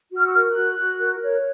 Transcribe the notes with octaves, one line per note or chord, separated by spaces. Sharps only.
F#4
F6
E6
A#4 F6
F#6
F#4
F#4
A#4
C#5